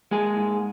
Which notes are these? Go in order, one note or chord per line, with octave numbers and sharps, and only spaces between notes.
G#3 A#3 G#4
G#2